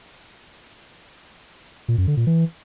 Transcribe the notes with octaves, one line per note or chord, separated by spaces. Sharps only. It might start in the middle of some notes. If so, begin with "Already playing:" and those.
A#2
F#2
D3
A#2
E3